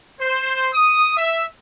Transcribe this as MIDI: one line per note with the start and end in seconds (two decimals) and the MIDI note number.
0.20 0.68 72
0.73 1.17 87
1.17 1.43 76